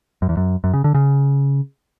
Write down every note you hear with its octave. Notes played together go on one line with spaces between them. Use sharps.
F#2
E2
F#2
F#2
C#3
D3
C#3